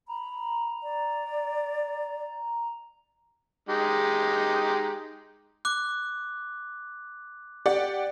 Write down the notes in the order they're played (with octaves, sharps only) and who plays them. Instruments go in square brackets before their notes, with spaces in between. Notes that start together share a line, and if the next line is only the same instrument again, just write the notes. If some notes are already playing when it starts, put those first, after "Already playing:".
[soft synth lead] A#5 [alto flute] B5
[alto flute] D5
[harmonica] G#3 D#4 G4
[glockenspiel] D6 F#6
[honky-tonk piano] G4 D5 F#5